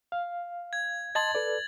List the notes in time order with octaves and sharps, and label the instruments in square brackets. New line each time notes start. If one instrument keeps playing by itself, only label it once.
[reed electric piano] F5
[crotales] G#6
[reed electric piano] D#5 A5 C6 [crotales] G#6 A6 F#7
[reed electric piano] A4 B4 D5